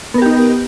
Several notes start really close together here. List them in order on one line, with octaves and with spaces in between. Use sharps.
B3 A#4 G4 D#4